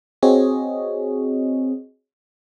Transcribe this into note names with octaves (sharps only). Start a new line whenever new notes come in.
C4 F#4 G#4 C#5 D#5